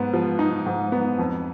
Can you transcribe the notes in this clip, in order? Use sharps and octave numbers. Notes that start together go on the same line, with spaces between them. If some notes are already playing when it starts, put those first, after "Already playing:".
Already playing: G#2 B3
F3
D#4
G#2
B3
F2